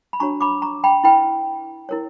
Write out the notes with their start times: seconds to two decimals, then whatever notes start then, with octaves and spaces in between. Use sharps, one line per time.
0.13 B5
0.20 D4 F#4 C#5 A#5 C#6
0.41 B5 D6
0.62 A#5 C#6
0.84 G5 B5
1.04 E4 B4 G5 B5
1.89 E4 A#4 C#5